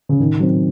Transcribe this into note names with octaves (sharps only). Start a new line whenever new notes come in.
C#3
A2 D#3
F#3 C4